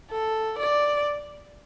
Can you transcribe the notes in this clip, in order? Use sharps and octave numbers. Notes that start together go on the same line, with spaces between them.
A4
D5